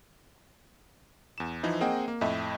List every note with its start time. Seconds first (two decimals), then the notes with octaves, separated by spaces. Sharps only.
1.38 E2 E7
1.63 E3 F3 D#4 E4 C5
1.81 A#3 C4 G#4 D#5 F#5 G5
2.08 A#3
2.21 F2 A2 D#5 E5